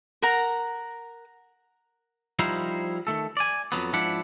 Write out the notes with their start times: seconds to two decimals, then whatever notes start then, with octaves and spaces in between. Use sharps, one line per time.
0.22 A#4 F#5 A#5
2.39 F3 G3 D#4 E4 A#4 C5
3.07 D#3 A3 A4
3.37 D5 G#5
3.72 F2 G#2 F#3 B3
3.93 G#2 F3 D4 E4 F#5